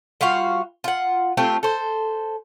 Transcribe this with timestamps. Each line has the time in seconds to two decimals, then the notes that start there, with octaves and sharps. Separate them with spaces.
0.21 G3 F4 F#4 F5
0.84 F4 F#5
1.37 A3 C4 F4 G4
1.63 A4 C5